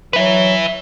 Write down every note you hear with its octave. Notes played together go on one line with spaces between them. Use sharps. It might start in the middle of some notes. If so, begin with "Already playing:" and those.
F#3 B4 E5